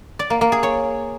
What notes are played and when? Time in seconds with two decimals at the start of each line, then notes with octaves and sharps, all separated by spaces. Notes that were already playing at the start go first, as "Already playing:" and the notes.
0.19 D5
0.30 A#3
0.41 A#3
0.52 G#4
0.63 C#5